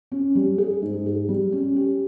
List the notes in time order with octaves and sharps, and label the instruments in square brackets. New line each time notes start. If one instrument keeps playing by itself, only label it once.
[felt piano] C#4
G3
G#4
G#2
G#4
G3
C#4
G4